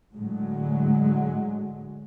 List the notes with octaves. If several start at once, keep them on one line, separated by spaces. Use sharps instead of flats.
A2 D3 F#3 G#3